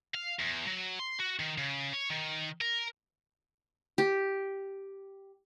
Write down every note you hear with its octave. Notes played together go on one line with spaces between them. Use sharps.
F5
E2
F#3
C6
F#4
D#3
C#3
C#5
D#3
A#4
G4